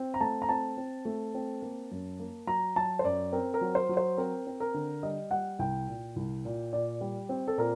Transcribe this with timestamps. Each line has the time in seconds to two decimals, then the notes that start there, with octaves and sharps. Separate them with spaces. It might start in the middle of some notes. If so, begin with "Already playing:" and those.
Already playing: C4
0.14 A#5
0.21 A3 A5
0.42 A#5
0.49 C4 A5
0.77 C4
1.05 A3
1.34 C4
1.62 A#3
1.91 F#2
2.19 A#3
2.47 F#3 A#5
2.76 F#3 A5
2.99 C5
3.04 F#2 D5
3.32 C4 A#4
3.54 A#4
3.61 F#3
3.75 C5
3.89 F#3
3.97 C5
4.18 C4 A#4
4.47 C4
4.60 A#4
4.74 D3
5.03 G3 D#5
5.31 G3 F#5
5.59 C2 G5
5.88 A#2
6.16 C2
6.45 A#2
6.73 A#2 D5
7.01 G3
7.29 C4
7.48 A4
7.58 A#2 A#4